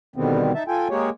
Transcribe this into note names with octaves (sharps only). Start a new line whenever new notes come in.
B2 D3 D#3 G3 B3 C4
D#4 E5 A5
F4 A4 G5 G#5
G#3 A#3 G4 G#4 C#5